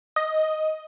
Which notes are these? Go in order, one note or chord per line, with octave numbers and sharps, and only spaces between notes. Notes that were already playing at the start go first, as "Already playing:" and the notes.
D#5